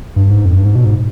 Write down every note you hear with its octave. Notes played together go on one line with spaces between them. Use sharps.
G2
G#2
F2
G2
G#2
B2
G#2